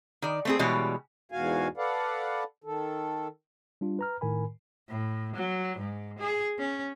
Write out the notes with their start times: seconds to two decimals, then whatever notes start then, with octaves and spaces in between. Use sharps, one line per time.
0.22 D#3 D5
0.45 A3 C4 G#4
0.59 B2 E3 G3 G#3 C#5
1.32 E2 G#2 B2 F#4 F5 G#5
1.77 A4 B4 D5 F5 F#5
2.64 D#3 A4
3.81 G3 D4 F4
3.99 B4 A#5 F6
4.21 A2 D#3 A#4 G#5 B5
4.89 A2
5.36 F#3
5.79 G#2
6.19 G#4
6.59 C#4